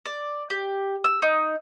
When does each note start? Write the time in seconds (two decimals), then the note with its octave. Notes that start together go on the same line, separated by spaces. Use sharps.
0.06 D5
0.50 G4
1.04 E6
1.22 D#4